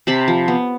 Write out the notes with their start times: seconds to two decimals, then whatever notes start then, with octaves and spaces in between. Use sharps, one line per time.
0.07 C3 A5 B5
0.28 F3
0.48 B3